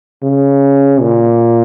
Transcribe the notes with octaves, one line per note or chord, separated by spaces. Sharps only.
C#3
A#2